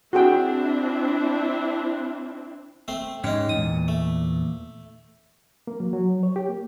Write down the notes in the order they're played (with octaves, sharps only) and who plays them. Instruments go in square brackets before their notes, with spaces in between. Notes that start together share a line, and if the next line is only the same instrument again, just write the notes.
[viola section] C4 D4 E4 [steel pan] F#4 G#4 G5
[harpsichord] A3 C4 C6
[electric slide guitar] G#2 G#3 C#4 [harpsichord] D#4 G4
[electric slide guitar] E2 A#2 [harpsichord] D#6
[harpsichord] A3
[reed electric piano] A#3
F#3
F#3
C#5
G4
A#3